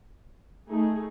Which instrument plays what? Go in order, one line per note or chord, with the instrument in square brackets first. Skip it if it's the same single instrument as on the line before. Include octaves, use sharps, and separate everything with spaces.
[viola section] A3 D#4 G#4